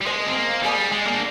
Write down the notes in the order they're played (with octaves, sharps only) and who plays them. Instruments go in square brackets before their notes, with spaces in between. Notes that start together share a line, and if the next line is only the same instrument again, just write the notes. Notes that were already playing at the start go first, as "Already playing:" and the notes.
[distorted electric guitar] G3
[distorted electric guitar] G#3 [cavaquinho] C5 D#5 G#5
[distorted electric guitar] C4
A#3
[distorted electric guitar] G3 [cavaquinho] G#4 D5 G#5 D#6
[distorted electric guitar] G#3
A#3
D4